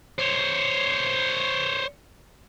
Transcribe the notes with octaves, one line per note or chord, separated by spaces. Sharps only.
C5 C#5